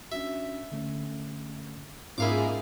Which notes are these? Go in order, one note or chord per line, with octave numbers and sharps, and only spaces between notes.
C#4 D4 F#4 E5
D3 A3 C#4
G#2 A#3 C#4 E4 F4 G#4 F5 D6